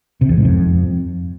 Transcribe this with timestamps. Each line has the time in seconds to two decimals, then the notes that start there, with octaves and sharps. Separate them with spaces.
0.21 C3
0.29 E2
0.37 G#2
0.45 F2